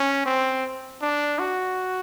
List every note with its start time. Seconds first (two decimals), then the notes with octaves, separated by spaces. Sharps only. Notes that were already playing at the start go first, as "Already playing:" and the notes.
Already playing: C#4
0.26 C4
1.02 D4
1.39 F#4